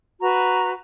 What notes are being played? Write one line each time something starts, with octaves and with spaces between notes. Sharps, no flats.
F#4 B4 A#5